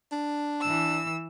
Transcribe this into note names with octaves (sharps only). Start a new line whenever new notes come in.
D4
E3 E6